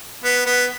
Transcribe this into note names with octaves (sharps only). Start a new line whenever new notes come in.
B3
B3